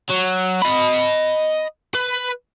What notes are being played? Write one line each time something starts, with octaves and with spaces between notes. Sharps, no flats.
F#3
D#5 B5
B4